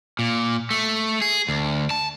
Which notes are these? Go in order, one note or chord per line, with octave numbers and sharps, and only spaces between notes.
A#2
A3
G#4
D2
A5